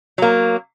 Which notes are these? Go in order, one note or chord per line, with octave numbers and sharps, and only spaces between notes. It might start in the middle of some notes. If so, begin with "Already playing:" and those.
F#3 A#3